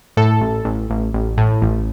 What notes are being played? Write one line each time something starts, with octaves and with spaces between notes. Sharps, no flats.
A2 A4
A1
A1
A1
A1
A2
A1